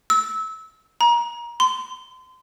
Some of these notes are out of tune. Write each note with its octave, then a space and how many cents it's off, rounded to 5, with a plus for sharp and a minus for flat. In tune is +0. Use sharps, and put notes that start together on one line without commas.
E6 -25
A#5 +25
C6 -30